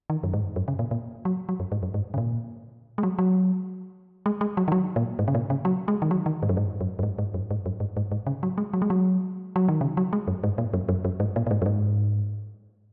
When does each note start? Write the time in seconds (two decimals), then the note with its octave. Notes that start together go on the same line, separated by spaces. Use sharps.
0.10 D#3
0.23 F#2
0.33 G#2
0.56 F#2
0.68 C#3
0.79 A#2
0.91 A#2
1.25 F#3
1.49 F#3
1.60 F#2
1.72 G#2
1.83 F#2
1.94 G#2
2.14 C#3
2.18 A#2
2.98 G#3
3.03 F#3
3.19 F#3
4.26 G#3
4.41 G#3
4.57 F#3
4.68 D#3
4.72 F#3
4.96 A#2
5.19 G#2
5.28 C#3
5.35 A#2
5.50 C#3
5.65 F#3
5.88 G#3
6.02 D#3
6.11 F#3
6.26 D#3
6.43 G#2
6.49 F#2
6.57 G#2
6.81 F#2
6.99 F#2
7.03 G#2
7.19 G#2
7.34 F#2
7.51 G#2
7.66 F#2
7.80 G#2
7.97 G#2
8.12 G#2
8.27 C#3
8.43 F#3
8.58 G#3
8.73 F#3
8.82 G#3
8.90 F#3
9.56 F#3
9.68 D#3
9.81 C#3
9.97 F#3
10.13 G#3
10.28 F#2
10.44 G#2
10.58 A#2
10.74 F#2
10.89 F#2
11.05 F#2
11.20 G#2
11.36 A#2
11.47 A#2
11.51 G#2
11.62 F#2
11.66 G#2